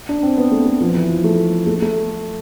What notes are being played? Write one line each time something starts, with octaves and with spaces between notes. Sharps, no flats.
D4
C4
B3
A3
A3
F3
E3
F3
A3
A3
A3